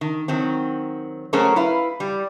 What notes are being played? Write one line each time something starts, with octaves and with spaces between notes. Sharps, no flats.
D#3
D#3 F#3 C4
F#3 A3 C#4 G#4 A#4 C5
E4 B4 F5
G3